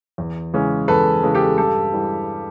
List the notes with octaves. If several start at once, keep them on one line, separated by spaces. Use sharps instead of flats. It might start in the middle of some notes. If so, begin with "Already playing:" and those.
E2
C#3 E3 G#3 C#4
E2 A4 B4
C#3 E3 G#3 C#4
G4 A4
G2 G4 A4
E3 G3